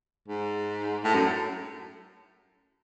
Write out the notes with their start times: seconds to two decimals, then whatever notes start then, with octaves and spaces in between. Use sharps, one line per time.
0.28 G#2
1.04 A2
1.14 F#2